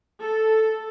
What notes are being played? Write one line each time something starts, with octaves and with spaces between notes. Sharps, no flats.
A4